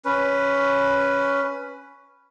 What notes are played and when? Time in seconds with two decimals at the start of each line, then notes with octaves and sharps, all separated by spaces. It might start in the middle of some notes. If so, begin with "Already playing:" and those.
0.05 C#4 B4